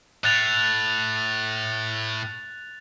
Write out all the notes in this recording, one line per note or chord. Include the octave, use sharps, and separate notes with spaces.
A2 F#6 A6 F7